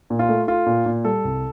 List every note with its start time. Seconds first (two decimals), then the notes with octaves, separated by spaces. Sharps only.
0.10 A#2
0.19 F4
0.29 A3
0.47 A3 F4
0.66 A#2
0.86 A#2
1.05 G3 A4
1.24 C2